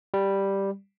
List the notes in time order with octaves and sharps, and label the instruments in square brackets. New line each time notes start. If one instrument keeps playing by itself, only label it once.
[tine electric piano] G3